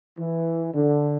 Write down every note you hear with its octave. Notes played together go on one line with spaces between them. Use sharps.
E3
D3